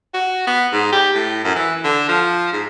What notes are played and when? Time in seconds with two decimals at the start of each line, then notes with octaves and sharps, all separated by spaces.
0.14 F#4
0.47 B3
0.73 G#2
0.92 G4
1.15 A2
1.45 F#2
1.56 E3
1.84 D3
2.09 F3
2.53 G#2